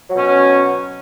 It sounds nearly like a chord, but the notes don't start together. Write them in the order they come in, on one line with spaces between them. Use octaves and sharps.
F#3 B2 C#4